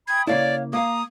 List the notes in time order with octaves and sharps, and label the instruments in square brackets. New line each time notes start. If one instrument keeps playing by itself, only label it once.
[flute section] G5 B5 D#6 [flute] G#6
[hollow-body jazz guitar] C#3 A#3 E4 [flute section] C#5 F5 [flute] D5
[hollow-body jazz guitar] A#3 F5 [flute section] A#5 [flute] D#6